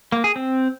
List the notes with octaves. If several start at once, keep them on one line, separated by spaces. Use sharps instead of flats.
A#3
G#4
C4